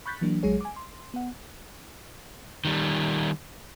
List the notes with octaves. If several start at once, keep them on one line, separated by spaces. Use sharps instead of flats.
B5 C#6 F#6 G6 A6 B6
E3 F#3 A#3 D4
A#1 F#3 G#3 G#4 C#5
G#5 D6
C6
B3 F#5
D#3 G3